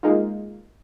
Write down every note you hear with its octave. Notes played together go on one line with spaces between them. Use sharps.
G#3 A#3 D#4 F4